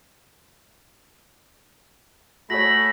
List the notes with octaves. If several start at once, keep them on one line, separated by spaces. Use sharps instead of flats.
A3 F#4 G#4 C#5 B5 A#6